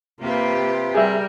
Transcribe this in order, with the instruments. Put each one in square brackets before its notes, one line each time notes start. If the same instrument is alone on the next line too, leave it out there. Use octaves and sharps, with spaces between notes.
[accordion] C3 [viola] A#3 [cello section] F4 G4 B4
[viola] G3 A#4 [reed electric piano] G#4 E5